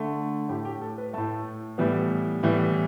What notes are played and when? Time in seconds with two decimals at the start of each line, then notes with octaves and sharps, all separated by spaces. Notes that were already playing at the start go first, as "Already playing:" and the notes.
Already playing: D3 A3
0.49 A2 A3 G4
0.65 G4
0.82 A4
0.98 B4
1.14 A2 A3 A5
1.78 A2 E3 G3 B3
2.43 A2 E3 G3 B3